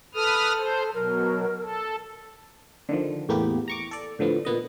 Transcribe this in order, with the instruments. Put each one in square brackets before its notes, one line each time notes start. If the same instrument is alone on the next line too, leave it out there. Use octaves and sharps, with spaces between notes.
[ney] A4 [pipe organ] B4 D#6 F6
[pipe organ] C5
[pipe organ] B2 F#3 [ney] A#4
[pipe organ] A4
[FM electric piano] D3 D#3 F3
E2 A2 A#3 B3 G4
A#5 C#6 D6
A4 D5
A2 D3 F3 B3
A#2 B3 D#5